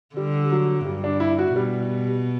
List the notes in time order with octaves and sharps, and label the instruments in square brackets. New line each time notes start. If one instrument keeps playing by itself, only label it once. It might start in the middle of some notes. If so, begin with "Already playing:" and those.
[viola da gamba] D3 [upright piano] G3
[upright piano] F#3
[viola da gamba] G2 [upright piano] G3
[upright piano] D4
E4
F#4
[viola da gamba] B2 [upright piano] G3